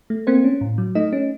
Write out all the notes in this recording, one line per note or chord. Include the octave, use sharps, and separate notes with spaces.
A3
A#3 C4 C5
C#4
A2
F#3
A3 D#4 D#5
C#4